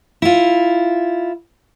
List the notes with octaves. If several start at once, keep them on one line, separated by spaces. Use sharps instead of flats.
E4 F4